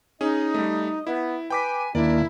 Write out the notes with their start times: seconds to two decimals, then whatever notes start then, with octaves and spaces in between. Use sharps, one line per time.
0.21 C#4 D#4 G#4 D#5
0.54 G3 A3
1.07 B3 E4
1.50 B4 G5 G#5 D6 B6
1.95 D#2 A#3 D4 E4 D5